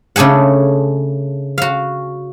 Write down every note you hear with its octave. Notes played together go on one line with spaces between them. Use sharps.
C#3 A3 D4 G#4 F#5
F#4 F5